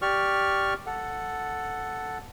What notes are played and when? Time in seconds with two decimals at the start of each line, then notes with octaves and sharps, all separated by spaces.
0.02 G4 D5 C#6 F6
0.86 A4 F#5